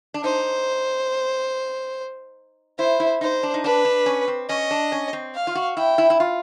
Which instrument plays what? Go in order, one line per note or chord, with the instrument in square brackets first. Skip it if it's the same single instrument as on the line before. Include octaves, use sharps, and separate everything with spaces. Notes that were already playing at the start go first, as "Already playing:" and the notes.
[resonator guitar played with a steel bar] D4
[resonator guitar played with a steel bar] D#4 [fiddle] C5
[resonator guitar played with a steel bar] E4 [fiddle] C5
[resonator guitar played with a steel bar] E4
[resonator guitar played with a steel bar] D#4 [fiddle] C5
[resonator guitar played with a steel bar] D4
D#4
[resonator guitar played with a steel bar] D4 [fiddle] B4
[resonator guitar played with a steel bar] D4
C#4
C4
[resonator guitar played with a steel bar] C#4 [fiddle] D#5
[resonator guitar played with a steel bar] D4
C#4
C4
[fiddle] F5
[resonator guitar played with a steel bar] F4
F#4
[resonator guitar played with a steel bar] E4 [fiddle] G5
[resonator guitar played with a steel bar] E4
E4
F4